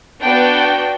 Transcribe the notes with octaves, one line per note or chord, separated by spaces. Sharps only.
B3 D4 F#4 G5